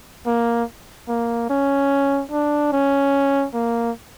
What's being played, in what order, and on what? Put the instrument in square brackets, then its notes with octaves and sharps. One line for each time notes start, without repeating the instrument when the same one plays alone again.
[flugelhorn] A#3
A#3
C#4
D4
C#4
A#3